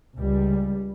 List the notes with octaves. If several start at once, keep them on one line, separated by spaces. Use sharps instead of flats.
C#2 G3